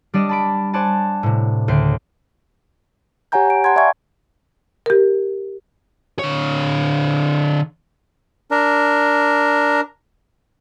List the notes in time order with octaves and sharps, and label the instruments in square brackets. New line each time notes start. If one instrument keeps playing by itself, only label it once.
[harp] G3 D4 D5 D#5
A5 B5 D7
C5 D5 F#5 G#5 A5
A2 C3
D2 C#3 G5 C7
[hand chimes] G4 C#5 F#5 G#5 A#5 G6
D7
F#5 A5 A#5 C6 G#6
D5 E5 F5 G#5 C#6 G#6
[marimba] G4 A#4
[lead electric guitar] D3 C#5
[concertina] D4 A#4